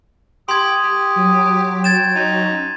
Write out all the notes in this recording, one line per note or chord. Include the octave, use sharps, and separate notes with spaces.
G4 C6 D#6 G#6
G4
F#3
G5 G#6 A6 E7
D#4
C#4